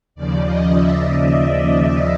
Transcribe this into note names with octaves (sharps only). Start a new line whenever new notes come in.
D#2 C#3 F3 D5
D#5
E5